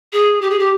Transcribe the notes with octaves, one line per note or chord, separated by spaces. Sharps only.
G#4
G4
G#4
G4